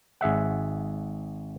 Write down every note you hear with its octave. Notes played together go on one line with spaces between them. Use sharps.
G#1 G#4 E5 F#5